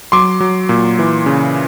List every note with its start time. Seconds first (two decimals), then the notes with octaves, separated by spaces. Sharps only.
0.12 F#3 C6 D6
0.40 F#3
0.69 A#2
0.99 E3
1.26 C#3